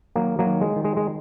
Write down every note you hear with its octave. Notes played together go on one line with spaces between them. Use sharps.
D#3 F#3 A#3
F#3 A#3
D#3
G#3
D#3
G#3
G#3